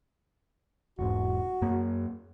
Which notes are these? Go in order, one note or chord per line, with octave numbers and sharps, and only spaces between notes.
E1 G#2 F#4
F#2 A#3